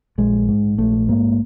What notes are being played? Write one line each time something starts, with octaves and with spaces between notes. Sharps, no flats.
A#1 G#3
G#2
A#1 A3
G#2 A#3